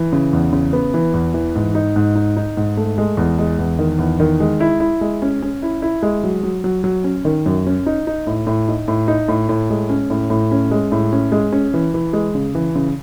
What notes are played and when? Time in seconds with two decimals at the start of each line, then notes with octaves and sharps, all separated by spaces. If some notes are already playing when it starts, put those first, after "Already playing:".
Already playing: E3
0.13 C#3
0.33 E2
0.53 C#3
0.73 B3
0.94 E3
1.14 E2
1.34 E3
1.55 G#2
1.75 D#4
1.96 G#2
2.15 D#4
2.37 D#4
2.57 G#2
2.77 A3
2.98 G#3
3.17 E2
3.39 G#3
3.59 E2
3.79 D#3
3.99 E2
4.20 D#3
4.40 G#3
4.60 E4
4.80 E4
5.01 G#3
5.22 C#4
5.42 C#4
5.62 E4
5.82 E4
6.02 G#3
6.24 F#3
6.43 F#3
6.64 F#3
6.84 F#3
7.04 C#4
7.25 D#3
7.46 F#2
7.66 C#4
7.86 D#4
8.07 D#4
8.27 A2
8.47 A2
8.68 D#4
8.88 A2
9.08 D#4
9.28 A2
9.49 A2
9.70 G#3
9.90 C#4
10.10 A2
10.30 A2
10.52 C#4
10.71 G#3
10.92 A2
11.13 C#4
11.32 G#3
11.52 C#4
11.74 E3
11.94 E3
12.13 G#3
12.35 C#3
12.55 E3
12.75 C#3